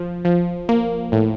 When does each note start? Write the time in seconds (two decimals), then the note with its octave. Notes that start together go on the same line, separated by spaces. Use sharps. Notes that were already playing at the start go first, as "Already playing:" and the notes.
Already playing: F3
0.25 F3
0.69 A#3
1.12 A2